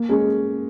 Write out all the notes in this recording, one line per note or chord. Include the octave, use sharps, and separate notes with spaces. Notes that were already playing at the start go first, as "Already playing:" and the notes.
Already playing: A#3
G#3 C#4